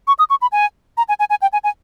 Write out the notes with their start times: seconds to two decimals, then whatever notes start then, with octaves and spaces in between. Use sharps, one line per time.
0.07 C#6
0.19 D#6
0.30 C#6
0.42 B5
0.52 G#5
0.97 A#5
1.08 G#5
1.19 G#5
1.30 G#5
1.42 G5
1.53 G#5
1.64 G#5